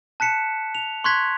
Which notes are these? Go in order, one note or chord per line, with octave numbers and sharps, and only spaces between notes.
A5 F#6 B6 C#7 E7
F7
C6 C#6 F#6 G#6 B6